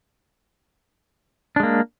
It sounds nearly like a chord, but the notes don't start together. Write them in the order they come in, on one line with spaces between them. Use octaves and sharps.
D4 G#3 A#3